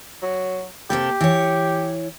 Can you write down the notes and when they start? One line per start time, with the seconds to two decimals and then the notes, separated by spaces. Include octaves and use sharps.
0.23 F#3
0.90 C3 A#3 G4 A4
1.21 E3 C#5